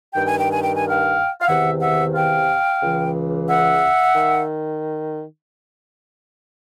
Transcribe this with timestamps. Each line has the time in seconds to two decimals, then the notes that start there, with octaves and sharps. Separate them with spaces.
0.13 G2 D#3 G5
0.27 G#5
0.38 G5
0.51 G#5
0.63 G5
0.76 G#5
0.88 F5 G5
1.41 F5
1.47 E2 C3 D#3 E5 F#5
1.81 E5 F#5
2.15 F5 G5
2.82 C#2 C#3 E3
3.49 E5 F#5
4.15 D#3